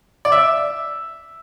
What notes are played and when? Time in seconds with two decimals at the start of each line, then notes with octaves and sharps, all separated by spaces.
0.25 D5
0.32 E5